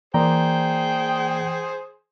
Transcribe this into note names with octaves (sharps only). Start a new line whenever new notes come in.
E3 A#3 G#4 C5 D5 G5 A#5